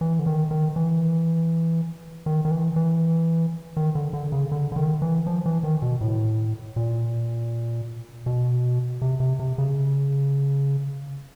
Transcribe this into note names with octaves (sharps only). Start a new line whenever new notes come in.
E3
D3
D#3
D#3
E3
D#3
D#3
E3
E3
D#3
D3
D3
C#3
D3
D3
D#3
E3
F3
E3
D#3
B2
A2
A#2
B2
C3
C3
C3
C#3